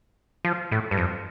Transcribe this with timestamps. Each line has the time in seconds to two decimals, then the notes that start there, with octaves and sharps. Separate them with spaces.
0.45 F3
0.72 A2
0.91 G2
0.97 F2